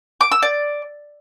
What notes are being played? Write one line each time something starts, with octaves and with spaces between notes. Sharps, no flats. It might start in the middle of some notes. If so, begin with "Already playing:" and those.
D6
E6
D5